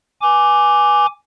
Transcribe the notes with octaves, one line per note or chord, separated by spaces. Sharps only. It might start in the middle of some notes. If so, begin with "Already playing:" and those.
G#5 D6